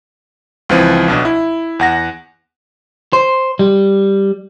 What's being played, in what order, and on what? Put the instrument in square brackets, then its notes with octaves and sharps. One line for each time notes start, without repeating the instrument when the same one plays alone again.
[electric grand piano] C#2 E3 F3 C4 D#7
B1 B2 D4
E4
E2 F#5 A#6
[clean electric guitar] C5
G3